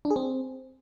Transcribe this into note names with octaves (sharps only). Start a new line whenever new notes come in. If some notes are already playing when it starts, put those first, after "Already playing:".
D4
G#4
C4